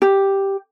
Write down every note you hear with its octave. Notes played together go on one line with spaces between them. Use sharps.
G4